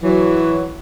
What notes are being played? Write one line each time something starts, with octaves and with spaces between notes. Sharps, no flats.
E3 F#3